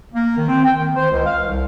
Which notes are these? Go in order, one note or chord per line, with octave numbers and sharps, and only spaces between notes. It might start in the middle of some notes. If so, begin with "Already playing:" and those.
A#3
D#3
C4
G5
D#3
C5
C#2
F5
C2